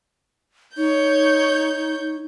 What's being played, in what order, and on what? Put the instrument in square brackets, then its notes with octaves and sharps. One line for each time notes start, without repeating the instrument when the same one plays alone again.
[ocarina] D#4 [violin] C#5 G6